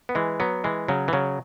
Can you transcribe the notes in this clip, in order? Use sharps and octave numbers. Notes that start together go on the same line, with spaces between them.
B3
E3 G#3
F#3 B3
E3 G#3
C#3 F#3
E3
C#3 F#3